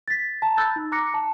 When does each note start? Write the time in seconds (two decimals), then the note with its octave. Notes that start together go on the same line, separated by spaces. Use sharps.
0.08 A6 B6
0.42 A5 A#5
0.57 B5 E6 F#6 G6 A6
0.76 D#4
0.92 A#5 D6 F#6 A#6 C#7
1.14 A5